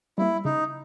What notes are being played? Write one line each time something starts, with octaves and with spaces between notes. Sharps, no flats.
G3 A#3 E4
C#3 D#4